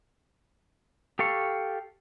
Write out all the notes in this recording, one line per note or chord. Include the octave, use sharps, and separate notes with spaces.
G4 A4 F5 C#6